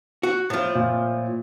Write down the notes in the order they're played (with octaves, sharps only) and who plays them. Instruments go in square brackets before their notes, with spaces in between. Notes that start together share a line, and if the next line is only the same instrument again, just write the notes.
[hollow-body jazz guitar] F#4
A2 F3
[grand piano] A#2